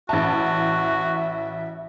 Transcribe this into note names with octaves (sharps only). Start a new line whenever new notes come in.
A1 F#4 E5 A5